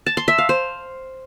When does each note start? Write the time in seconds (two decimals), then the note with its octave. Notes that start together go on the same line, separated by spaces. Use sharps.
0.06 A5
0.17 C6
0.28 E5
0.38 F5
0.49 C5